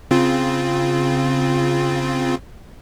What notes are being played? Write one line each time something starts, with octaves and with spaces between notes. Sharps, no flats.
C#3 C4 F4